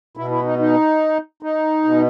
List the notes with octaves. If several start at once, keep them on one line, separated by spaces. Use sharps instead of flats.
B2 E4
E4
D#4
D#4
D#4
B2